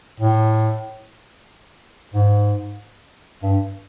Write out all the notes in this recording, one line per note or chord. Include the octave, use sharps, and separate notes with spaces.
A2
G#2
G2